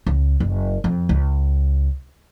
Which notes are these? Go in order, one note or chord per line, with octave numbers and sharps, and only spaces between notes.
C#2
F#1
F2
C#2